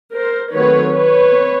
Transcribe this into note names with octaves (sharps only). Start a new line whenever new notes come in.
A#4 C5
D#3 F#3 A3 C4 B4 C#5
B4 C#5
C4